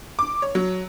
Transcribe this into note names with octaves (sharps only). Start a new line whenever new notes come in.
D6
C#5
F#3